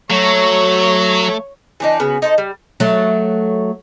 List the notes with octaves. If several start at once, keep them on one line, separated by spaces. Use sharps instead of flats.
F#3 A3 C#5
E3 D4 D#4
C#3 B3 F#4
D#4 A4 C5
G3
F#3 A3